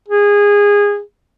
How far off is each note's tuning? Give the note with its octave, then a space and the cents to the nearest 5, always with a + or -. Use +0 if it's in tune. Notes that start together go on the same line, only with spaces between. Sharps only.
G#4 -20